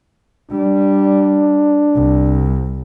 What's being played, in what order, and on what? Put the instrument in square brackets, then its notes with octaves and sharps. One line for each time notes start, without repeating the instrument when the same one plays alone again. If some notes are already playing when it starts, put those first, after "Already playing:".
[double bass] G3 [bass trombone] D4
[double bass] C2